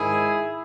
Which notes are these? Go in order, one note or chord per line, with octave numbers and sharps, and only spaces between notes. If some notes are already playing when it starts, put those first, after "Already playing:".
Already playing: G#2 D#3 G#3 E4 G#4